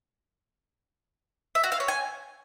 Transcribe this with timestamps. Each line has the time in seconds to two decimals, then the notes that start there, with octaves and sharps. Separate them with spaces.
1.55 E5
1.63 F#4
1.72 F5
1.80 C#5
1.88 G#5